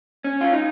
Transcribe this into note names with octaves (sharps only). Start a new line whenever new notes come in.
C#4
F4
D#4